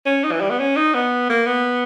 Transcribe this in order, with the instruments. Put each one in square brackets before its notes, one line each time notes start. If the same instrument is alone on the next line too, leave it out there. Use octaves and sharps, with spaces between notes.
[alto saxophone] C#4
D#4
E3
G3
B3
C#4
D#4
B3
A#3
B3